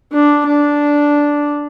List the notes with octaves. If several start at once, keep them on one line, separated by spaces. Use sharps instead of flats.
D4
D4